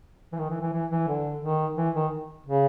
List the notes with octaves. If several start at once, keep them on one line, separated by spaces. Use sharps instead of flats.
E3
D#3
E3
E3
E3
E3
D3
D#3
E3
D#3
C#3